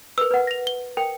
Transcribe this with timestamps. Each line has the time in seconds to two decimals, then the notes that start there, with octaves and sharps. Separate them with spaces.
0.18 A#4 B4 E6
0.31 B4 F#5
0.47 A#6 F7
0.67 G7
0.97 A#4 G5